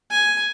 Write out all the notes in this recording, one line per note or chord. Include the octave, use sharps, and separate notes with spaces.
G#5